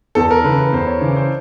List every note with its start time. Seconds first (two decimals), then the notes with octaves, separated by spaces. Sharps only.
0.15 E2 A4
0.31 A#4
0.44 C#3 E3 B4
0.58 B4
0.72 E2 C5
0.86 C#5
1.01 C#3 E3 D5
1.16 C5